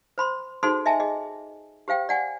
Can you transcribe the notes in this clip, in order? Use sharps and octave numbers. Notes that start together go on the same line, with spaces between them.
C5 B5 C6
D#4 F#4 G#4 A4 C5 C6
D#5 E5 G#5 A5
G#4 D#5
G4 C5 F5 G5
D5 F#5 G#5